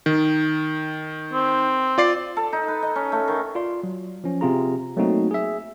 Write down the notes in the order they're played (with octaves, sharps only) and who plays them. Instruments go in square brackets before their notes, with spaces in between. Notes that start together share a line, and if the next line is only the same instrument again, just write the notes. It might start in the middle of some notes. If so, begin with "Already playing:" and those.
[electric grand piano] D#3
[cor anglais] C4
[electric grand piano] F4 D5 C7
[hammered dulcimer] A4
D#4
B4
D#5
C#4
A3
D#3
[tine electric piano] F4 D5 C6
F#3
F3 C#4
C3 C4 F4 G#4 A#5
F#3 A3 A#3 C4 D#4 F#4
G#4 E5